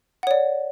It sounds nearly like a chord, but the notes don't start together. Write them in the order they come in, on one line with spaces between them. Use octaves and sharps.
F#5 C#5 D5